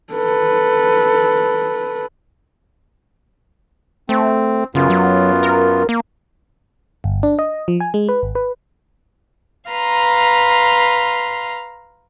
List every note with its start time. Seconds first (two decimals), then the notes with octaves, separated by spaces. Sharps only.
0.14 A4 B4
4.09 A3 C4
4.75 F#2 C#3 B3 F4
4.90 F#3
5.43 A#4
5.89 A#3
7.04 G1
7.23 D4
7.39 D#5
7.68 F3
7.80 G#5
7.94 G#3
8.09 B4
8.23 G#1
8.35 B4
9.71 B4 F5 A#5 C6